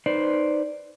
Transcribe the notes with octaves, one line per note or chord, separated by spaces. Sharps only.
D#4 B4 C5 D5